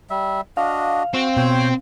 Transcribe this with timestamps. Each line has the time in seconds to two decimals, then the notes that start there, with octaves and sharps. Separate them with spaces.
0.10 G3 E5
0.57 D4 F#4 D#5 F5
1.14 C4 F#4
1.37 B2 C5 C#5 G5